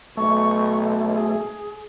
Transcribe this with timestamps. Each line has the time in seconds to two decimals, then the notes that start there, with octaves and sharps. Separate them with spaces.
0.17 B1 A3 C#6
1.12 G#4